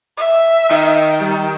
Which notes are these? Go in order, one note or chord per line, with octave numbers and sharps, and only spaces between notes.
E5
D#3 D#5
G3